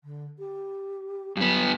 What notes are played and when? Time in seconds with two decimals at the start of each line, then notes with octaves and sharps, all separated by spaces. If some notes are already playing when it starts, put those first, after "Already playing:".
0.04 D3
0.38 G4
1.37 G2 F#3 B3